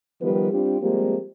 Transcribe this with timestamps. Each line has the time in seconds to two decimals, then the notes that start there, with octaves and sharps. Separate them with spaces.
0.22 D#3 F3 G3 B3 G4 B4
0.52 G3 C4 D4 F4 G4
0.81 F3 G3 G#3 A#3 C4 G4